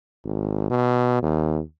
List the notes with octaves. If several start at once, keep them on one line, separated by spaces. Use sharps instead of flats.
G#1
B2
D#2